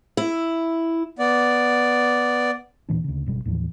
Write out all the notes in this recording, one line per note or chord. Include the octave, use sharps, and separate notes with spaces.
E4
B3 D5
D#1 A#2 E3 D4
D2 C#3
F#1 B2 G3
D#2 A2 E3 F3